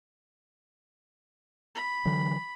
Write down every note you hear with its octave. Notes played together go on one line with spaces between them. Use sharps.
B5
D3 E3 F#3